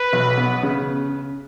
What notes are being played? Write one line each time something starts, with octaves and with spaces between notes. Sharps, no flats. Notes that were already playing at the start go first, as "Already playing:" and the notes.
Already playing: B4
B1
B3
C#3